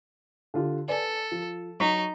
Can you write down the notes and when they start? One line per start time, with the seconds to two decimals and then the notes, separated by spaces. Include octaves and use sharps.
0.54 D3 F4 G4
0.88 A4 B4 D5 G#5
1.32 F3
1.80 F#3 D#4 C#6 B6